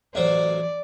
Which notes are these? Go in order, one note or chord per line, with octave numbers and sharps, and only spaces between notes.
A1 F#3 C5 D5